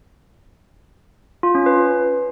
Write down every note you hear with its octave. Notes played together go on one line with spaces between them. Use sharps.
F4
C#4
B4